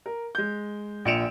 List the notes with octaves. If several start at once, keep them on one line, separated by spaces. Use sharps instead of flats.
A#4
G#3 G6
A#1 A#2 C#7 D7 E7 F7